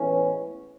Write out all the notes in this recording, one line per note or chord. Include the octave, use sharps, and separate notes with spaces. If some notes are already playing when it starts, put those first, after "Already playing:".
Already playing: A2 E3 G#3 B3 C#4